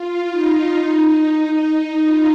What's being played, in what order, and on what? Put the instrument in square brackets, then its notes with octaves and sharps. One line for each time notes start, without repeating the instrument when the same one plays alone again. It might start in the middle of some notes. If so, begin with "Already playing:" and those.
Already playing: [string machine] F4
D#4
D#4
D#4
F4